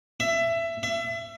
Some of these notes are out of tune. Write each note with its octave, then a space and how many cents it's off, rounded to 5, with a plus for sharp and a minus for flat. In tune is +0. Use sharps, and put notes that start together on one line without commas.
E5 +20
E5 +30